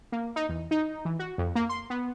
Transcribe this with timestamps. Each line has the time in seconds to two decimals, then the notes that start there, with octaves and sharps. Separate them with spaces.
0.12 A#3
0.36 D#4
0.49 E2
0.71 D#4
1.05 E3
1.19 F#4
1.38 F2
1.55 A#3
1.69 C6
1.90 B3